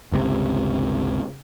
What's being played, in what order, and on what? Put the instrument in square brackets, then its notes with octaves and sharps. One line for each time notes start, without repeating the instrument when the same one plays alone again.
[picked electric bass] G1 C#2 C3